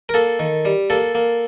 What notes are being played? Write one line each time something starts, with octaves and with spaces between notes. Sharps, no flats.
A#4
A#3 A4
D#3
G3
A#3 A4
A#3